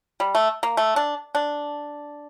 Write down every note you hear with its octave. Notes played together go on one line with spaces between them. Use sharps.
G3
A3
A#3
A3
D4
D4